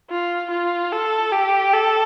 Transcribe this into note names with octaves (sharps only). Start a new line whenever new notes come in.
F4
F4
A4
G4
A4